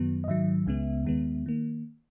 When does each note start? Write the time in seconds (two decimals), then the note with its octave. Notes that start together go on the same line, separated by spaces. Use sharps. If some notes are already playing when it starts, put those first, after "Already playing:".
Already playing: F#2 D#3 F#3 B3
0.24 D#5
0.27 G#2 D#3 F#3 E5
0.66 C#2 C#3 G#3 B3
1.05 D#2 D#3 G#3 B3
1.46 D#3 A#3